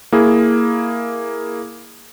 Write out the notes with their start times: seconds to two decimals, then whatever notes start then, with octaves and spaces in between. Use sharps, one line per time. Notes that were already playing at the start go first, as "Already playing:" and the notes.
0.12 A#3 E4 G#4